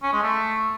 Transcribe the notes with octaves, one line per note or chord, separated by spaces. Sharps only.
C#4
G#3
A3